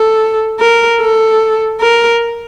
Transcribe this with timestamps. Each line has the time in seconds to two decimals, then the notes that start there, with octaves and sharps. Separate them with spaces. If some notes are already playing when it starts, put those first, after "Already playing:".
Already playing: A4
0.59 A#4
1.00 A4
1.80 A#4